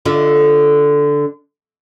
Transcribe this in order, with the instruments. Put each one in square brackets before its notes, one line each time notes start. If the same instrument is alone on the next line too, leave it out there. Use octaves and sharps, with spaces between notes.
[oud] D3 F4 E5